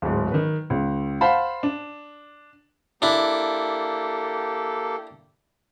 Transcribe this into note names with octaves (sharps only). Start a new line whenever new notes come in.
D1 G#2
D#3 B4
C#2
C5 F5 F#5 A5 B5
D4
A#3 D4 E4 G4 A4